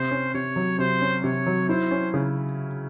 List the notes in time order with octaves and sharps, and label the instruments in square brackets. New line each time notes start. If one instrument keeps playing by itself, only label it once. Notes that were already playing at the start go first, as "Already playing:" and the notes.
Already playing: [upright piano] C3 [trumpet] C5
[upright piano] C#4
[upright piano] C3 [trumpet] C#5
[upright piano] F#3
[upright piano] C3 [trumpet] C5
[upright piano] C#4
[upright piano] C3 [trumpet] C#5
[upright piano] F#3
[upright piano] E4 [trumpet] C5
[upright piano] C#4
C#3